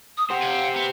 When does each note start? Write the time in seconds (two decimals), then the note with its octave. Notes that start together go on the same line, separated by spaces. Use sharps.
0.18 D#6
0.30 G4 C5 F#5
0.42 F5 G#5
0.76 B3